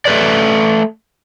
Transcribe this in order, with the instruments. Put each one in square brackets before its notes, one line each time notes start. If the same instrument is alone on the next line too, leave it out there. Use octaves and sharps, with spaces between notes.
[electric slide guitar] A3 B4 D5